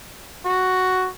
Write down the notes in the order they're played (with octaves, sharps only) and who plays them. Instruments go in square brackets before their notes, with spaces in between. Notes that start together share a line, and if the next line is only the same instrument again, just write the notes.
[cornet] F#4